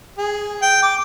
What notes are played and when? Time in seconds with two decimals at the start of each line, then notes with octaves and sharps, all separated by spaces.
0.18 G#4
0.62 G5
0.83 D6